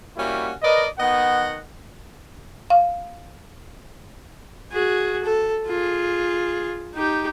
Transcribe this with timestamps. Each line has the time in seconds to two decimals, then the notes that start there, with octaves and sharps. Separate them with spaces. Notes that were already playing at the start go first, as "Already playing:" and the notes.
0.16 G3 A#3 C#4 E4 F#4
0.63 A#4 B4 D5 D#5
0.99 D#3 B3 D#5 F#5
2.70 F5
4.72 F#4 G#4
5.24 A4
5.68 F4 G#4
6.94 D#4 G4